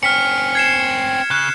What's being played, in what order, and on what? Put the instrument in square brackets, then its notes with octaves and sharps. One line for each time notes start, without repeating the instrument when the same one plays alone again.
[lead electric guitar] C4 C#4 [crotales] F6 B6 C#7
[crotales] G#6 C7 E7
[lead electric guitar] C#3 [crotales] F#6